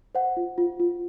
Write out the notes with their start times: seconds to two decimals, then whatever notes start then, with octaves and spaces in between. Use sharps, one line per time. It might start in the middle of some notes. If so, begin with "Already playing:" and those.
0.15 C5 F#5
0.37 F4
0.58 F4
0.80 F4